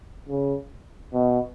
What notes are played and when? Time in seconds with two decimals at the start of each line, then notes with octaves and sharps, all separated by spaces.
0.29 C#3
1.13 B2